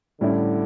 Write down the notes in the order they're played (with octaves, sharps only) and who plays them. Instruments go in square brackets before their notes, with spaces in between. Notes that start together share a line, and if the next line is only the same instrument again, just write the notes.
[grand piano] A2 G3 C#4 E4 [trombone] D3